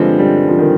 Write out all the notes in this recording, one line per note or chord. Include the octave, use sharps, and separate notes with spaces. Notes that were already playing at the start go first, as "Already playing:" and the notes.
Already playing: G2 D3 F3 G3 G#3 C4
G3
F3
D#3